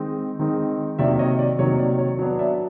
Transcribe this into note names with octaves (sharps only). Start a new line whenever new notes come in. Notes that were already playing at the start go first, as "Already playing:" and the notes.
Already playing: D#3 G#3 C4 D#4
D#3 G#3 C4 D#4
C3 D#3 F#3 A#3 D5 E5
C#5 D#5
D5
C3 D#3 F#3 A#3 C#5
D5
C#5
F#3 B3 D4
D5 E5